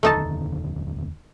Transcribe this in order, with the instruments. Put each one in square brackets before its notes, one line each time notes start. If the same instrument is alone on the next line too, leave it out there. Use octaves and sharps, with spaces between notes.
[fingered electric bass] F1 D#2 D3 [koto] A3 D#4 A5